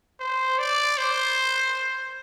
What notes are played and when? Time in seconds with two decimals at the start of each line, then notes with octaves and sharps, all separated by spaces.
0.20 C5
0.59 D5
0.98 C5